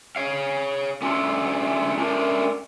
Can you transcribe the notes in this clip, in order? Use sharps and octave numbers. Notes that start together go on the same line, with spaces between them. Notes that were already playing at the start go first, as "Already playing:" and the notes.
C#5 F5
A3 C#4 D4 E4 F4 A4
A3 C#4 D4 A#4